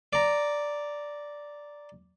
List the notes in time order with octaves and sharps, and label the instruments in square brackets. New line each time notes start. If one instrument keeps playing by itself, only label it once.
[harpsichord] D5 A#5